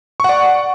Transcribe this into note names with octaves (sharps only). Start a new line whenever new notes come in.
D5 F#5 C#6